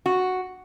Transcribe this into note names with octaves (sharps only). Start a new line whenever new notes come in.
F#4